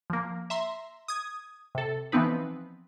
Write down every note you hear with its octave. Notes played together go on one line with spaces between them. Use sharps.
F3 A#3
E5 A#5 C6
D#6 G#6
C3 A4
E3 F3 B3 C4 D#4 B4